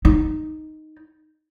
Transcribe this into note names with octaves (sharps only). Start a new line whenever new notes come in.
D#4